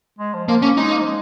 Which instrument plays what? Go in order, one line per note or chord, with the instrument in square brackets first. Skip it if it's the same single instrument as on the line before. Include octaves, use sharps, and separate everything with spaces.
[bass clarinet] G#3
F3
[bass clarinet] F3 [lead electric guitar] A#3
[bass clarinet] A#3 [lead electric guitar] C#4
[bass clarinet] G#3 [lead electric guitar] D#4
[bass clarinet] A#3
F3
G#3